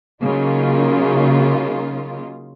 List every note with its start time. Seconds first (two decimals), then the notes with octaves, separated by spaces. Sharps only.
0.23 C#3 F#3 A#3 D#4 F4